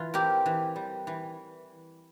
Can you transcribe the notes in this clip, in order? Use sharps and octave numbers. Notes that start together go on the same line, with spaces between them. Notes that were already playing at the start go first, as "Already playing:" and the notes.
Already playing: E3 F4
C4 G4 A#4
E3
G3
E3